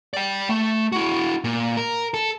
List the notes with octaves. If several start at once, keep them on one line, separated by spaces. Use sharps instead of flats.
D5 G5
A3
E4 F#4
A#2
A#4
A4